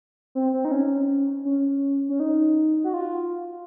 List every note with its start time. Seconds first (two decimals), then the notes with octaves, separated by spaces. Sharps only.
0.35 C4
0.53 C4
0.65 D#4
0.72 C#4
1.45 C#4
2.09 C#4
2.20 D#4
2.84 F#4
2.94 F4